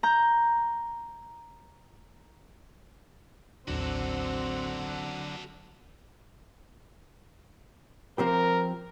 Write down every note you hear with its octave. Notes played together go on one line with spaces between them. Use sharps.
A#5 G6
A1 D#2 D3 F#3 C4 D4 F#4 A4
F3 C4 G4 A#4